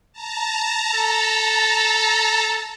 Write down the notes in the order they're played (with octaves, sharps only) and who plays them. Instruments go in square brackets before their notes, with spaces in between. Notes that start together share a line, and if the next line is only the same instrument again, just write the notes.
[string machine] A5 A#5
[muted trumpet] A4